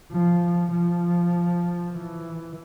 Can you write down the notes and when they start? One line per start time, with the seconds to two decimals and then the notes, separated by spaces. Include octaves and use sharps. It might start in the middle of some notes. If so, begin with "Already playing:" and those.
0.12 F3
0.72 F3
1.92 E3